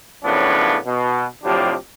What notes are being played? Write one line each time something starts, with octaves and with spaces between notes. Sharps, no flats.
F#2 A2 C#3 F3 B3 D4
B2
A2 C3 F3 F#3 D4 G4